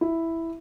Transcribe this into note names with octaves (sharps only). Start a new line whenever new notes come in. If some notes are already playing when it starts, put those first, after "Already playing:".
E4